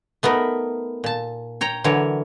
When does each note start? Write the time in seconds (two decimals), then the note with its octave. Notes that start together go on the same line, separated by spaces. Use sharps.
0.23 A3 B3 D#4 A#4 B4
1.04 A#2 A5
1.61 C#5 G5 A#5
1.84 D3 E3 F#3 A#4 C#5